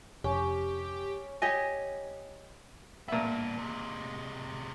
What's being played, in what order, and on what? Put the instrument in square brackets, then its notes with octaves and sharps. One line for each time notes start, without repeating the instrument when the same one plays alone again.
[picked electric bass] F1 F2 C3 [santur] C#4 [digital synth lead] G4
[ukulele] G4 C#5 D#5 G#5
[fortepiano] A#2 E5 [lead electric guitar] B3 D4
[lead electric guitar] C3 G#3